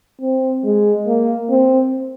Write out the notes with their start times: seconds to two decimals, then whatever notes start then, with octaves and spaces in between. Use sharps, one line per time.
0.21 C4
0.64 G#3
1.06 A#3
1.49 C4